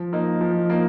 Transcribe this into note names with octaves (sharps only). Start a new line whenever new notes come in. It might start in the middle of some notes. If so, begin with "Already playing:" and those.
Already playing: F3
A#3 D#4
F3
A#3 D#4